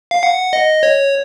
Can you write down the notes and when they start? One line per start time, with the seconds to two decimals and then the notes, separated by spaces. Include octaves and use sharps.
0.11 F5
0.23 F#5
0.53 D#5
0.83 C#5